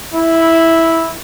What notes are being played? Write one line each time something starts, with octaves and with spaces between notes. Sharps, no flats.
E4